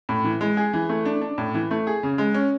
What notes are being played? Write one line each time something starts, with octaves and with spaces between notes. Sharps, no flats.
A2
E3
G#3
G#4
E3
A3
D4
D4
A2
E3
A3
G#4
C#3
G#3
C#4